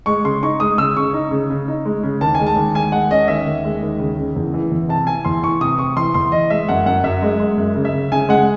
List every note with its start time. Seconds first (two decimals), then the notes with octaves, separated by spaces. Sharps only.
0.06 G#3 C#6
0.24 C#3 C6
0.43 D#4 C#6
0.60 G#3 D#6
0.78 C#3 E6
0.96 C#3 C#6
1.13 D#4
1.31 C#3
1.50 C#3
1.68 D#4
1.86 G#3
2.03 C#3
2.21 D#2 A5
2.35 G#3 G#5
2.47 A5
2.56 D#2
2.74 G#3 G#5
2.92 G#3 F#5
3.11 C#4 D#5
3.28 D#2 E5
3.47 D#2
3.65 G#3
3.83 D#2
3.99 C#3
4.18 C#3
4.36 E2
4.54 E3
4.72 E2
4.89 C3 A5
5.07 E3 G#5
5.25 E2 C6
5.43 E3 C#6
5.61 C3 D#6
5.79 C3 C#6
5.97 E3 C6
6.14 E2 C6
6.32 E3 D#5
6.50 G#3 E5
6.69 F#2 F#5
6.86 F#2 F#5
7.04 F#2 E5
7.22 G#3
7.40 G#3
7.57 F#2
7.75 C#3
7.85 E5
7.94 C#3
8.12 C#3 G#5
8.29 G#3 F#5